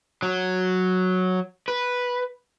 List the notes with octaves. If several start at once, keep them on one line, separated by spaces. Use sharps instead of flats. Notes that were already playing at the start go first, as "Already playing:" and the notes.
F#3
B4